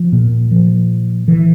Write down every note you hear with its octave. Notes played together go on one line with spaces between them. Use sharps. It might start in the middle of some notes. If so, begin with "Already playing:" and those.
Already playing: F3
A#2
F3
E3